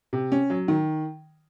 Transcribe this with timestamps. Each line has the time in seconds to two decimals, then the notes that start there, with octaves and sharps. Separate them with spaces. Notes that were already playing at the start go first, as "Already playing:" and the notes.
0.13 C3
0.32 C#4
0.50 F#3
0.68 D#3